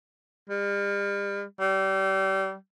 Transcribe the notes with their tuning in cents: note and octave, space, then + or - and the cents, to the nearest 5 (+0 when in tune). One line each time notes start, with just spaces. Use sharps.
G3 +40
G3 -30